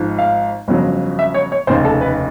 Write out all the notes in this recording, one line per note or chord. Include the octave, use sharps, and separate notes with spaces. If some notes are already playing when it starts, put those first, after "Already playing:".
Already playing: G#1 G#2 F3
F5
G1 F2 C#3 F#3
E5
C#5
C#5
F1 D#2 C#3 C5
A4
B4